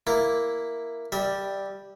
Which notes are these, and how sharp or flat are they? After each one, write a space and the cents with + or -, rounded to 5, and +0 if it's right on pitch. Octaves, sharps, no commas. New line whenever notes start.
A#3 +0 E4 +0
G3 +0 E5 -35